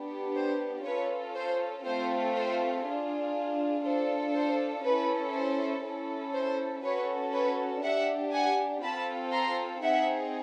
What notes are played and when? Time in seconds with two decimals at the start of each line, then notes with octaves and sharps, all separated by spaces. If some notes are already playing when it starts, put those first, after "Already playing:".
Already playing: B3 D4 G4
0.36 C5
0.85 C#4 F4 A4 B4 C#5
1.36 C5
1.85 A3 C4 F4 A4 C5
2.35 C5
2.84 D4 F4 G#4
3.84 D4 F4 A4 C5
4.35 C5
4.84 C#4 E4 A4 B4
5.34 C5
5.84 C#4 E4 A4
6.34 C5
6.83 C#4 F#4 A4 B4 C#5
7.33 B4 C#5
7.83 D4 G4 E5 F#5
8.33 F#5 G#5
8.82 C4 F4 A4 A5 B5
9.32 A#5 C6
9.83 C4 D#4 G#4 E5 F#5